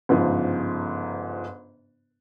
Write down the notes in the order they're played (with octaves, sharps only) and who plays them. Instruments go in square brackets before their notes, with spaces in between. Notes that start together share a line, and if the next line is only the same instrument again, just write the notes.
[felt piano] G1 G#2 C#3 F3